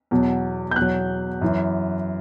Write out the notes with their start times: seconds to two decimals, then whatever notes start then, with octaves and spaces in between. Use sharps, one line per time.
0.11 E2 B2 F#3
0.71 G6
0.76 E2 B2 F#3 F#6
1.41 F#2 E3